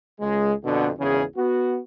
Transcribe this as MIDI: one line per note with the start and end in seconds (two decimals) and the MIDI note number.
0.20 0.53 37
0.20 0.53 56
0.64 0.88 41
0.64 0.88 47
0.64 0.88 50
0.99 1.22 32
0.99 1.22 40
0.99 1.22 49
0.99 1.22 61
0.99 1.22 68
1.36 1.80 59
1.36 1.80 66